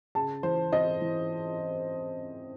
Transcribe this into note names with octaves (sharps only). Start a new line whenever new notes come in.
C#3 A5
E3 C5
C4 D#5
E3